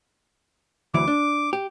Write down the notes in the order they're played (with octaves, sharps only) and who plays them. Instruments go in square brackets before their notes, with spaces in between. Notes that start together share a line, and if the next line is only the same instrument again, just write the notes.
[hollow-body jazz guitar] D2 E3 F#3 [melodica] D6
[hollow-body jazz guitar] D4
G4